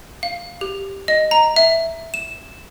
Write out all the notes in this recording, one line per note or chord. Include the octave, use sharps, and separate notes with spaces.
F5
G4
D#5
A#5
E5
E7